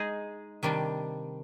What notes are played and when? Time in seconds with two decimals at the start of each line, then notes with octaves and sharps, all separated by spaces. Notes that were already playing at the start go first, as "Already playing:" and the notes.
Already playing: G#3 D#4 G#4
0.63 C3 D#3 G3 D4